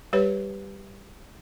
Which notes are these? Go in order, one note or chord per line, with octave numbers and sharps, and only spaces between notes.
G3 G4 B4 C#5